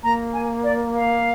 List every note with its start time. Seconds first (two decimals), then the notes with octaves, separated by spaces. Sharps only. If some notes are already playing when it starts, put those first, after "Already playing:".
0.03 A#3 A#5
0.33 G#5
0.64 D5
0.94 F5